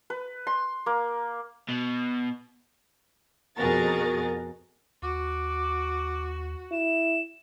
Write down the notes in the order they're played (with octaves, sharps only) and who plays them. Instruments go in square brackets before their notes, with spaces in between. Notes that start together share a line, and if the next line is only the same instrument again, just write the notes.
[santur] B4
C6
A#3
[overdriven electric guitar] B2
[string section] F2 B2 F#4 G#4 A#4 A6
[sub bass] D#2 [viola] F#4 [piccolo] D6
[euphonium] E4 [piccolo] E7